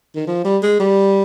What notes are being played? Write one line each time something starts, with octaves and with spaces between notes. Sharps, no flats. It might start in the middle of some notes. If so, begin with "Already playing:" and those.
D#3
F3
G3
G#3
G3